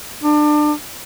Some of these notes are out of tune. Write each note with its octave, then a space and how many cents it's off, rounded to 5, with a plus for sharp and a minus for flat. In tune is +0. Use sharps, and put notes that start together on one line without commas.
D4 +30